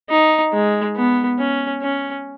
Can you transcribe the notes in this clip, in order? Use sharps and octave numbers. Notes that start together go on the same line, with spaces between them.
D#4
G#3
B3
C#4
C#4